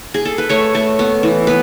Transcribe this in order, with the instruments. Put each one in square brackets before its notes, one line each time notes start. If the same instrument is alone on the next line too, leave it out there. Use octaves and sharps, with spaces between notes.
[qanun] G#4
A4
B4
A3 C#5
A3
B3
E3
B3 B4